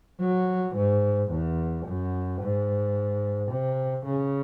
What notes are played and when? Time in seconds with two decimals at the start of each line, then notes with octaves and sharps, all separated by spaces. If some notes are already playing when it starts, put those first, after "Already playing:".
0.20 F#3
0.75 G#2
1.30 E2
1.86 F#2
2.41 G#2
3.51 C3
4.06 C#3